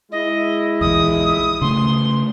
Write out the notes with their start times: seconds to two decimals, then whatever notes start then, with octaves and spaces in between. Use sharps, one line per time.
0.12 G#3 E4 D#5
0.81 A#1 E2 D#6
1.62 C#3 A3 C6